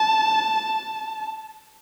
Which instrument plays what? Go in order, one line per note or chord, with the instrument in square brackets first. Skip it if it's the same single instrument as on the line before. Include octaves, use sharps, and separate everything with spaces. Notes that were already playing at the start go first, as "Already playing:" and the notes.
Already playing: [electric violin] A5